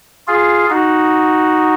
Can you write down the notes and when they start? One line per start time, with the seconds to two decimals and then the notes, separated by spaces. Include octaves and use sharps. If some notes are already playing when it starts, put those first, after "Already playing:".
0.27 F4 G#4
0.70 D#4 F#4